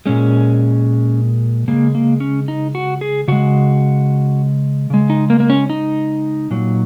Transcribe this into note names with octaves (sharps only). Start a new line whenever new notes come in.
A#2 G#3 C#4
C#3 G#3 A#3
A#3
C#4
D#4
F#4
G#4
C#3 G#3 F#4
C#3 G#3
D#4
A#3
A#3
C#4
D#4
A#2 F#3